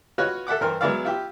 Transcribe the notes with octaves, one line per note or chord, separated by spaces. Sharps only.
F4 F#4 B4 C#5 D#5 F#5
A4 E5 F#5 D6
G2 E3 A#4 C5 F6
F#3 G#3 B3 E4 D5 F5
E4 F4 G4